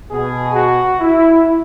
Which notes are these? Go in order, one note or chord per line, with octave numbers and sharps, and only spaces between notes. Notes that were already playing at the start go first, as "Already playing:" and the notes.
B2 B3 G#4
F#4
E4